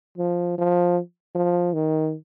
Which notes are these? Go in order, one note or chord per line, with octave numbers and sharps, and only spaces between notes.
F3
F3
F3
D#3